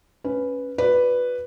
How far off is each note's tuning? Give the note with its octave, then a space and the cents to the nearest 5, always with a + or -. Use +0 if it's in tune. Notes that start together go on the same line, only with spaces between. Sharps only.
C#4 +0 B4 +0
F#4 -30 B4 +0 D5 -5